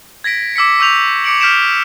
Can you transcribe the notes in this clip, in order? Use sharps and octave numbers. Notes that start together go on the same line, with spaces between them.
G#6 A#6 B6 D7
D6 E6 B6 C#7
C#6 E6 G6 F7
D6 C#7 D7 F#7
F6 G6 B6 D7 E7